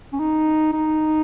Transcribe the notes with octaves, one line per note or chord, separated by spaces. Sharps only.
C#4
D#4
D#4